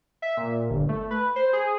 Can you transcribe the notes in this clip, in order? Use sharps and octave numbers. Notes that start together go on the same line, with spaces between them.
E5
A#2
G1
A3
B4
C5
G#4